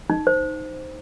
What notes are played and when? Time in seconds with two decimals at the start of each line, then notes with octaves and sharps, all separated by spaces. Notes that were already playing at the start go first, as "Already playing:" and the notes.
0.10 D#4
0.27 C5